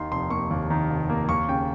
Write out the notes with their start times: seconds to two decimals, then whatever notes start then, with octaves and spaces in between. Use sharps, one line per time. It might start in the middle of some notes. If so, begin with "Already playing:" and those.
Already playing: D#2 D#3 C6
0.11 F1 C6
0.30 A#3 C#6
0.51 D#2
0.70 D#3
0.90 F1
1.10 A#3
1.29 D#2 C#6
1.48 C#3 G5